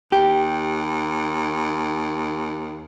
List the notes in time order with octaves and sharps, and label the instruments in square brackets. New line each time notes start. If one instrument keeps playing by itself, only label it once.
[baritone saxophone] D#2 [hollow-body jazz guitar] G4